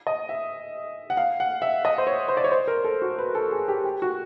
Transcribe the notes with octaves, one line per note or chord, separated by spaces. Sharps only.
D#5
E5
F#5
F5
F#5
E5
D#5
C5
C#5
C5
D5
C#5
C5
A#4
A4
F#4
B4
A4
G#4
G4
G4
F#4